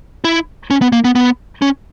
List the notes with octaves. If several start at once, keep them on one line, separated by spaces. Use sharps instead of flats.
E4
C#4
B3
A#3
B3
B3
C#4